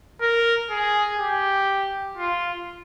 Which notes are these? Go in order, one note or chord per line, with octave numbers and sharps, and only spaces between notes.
A#4
G#4
G4
F4